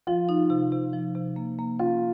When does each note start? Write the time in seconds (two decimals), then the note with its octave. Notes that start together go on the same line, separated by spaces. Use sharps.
0.07 F3 F4
0.29 D#4
0.50 C3
0.72 C3
0.93 F3
1.15 C3
1.36 A#3
1.59 A#3
1.79 C#4 F4